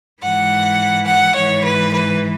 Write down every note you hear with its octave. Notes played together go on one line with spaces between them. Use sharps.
G#2 E3 F#5
F#5
G#2 E3 C#5
B4
B4